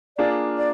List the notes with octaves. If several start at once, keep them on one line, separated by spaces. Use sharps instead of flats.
A#3 D4 F4 G#4 D5
D5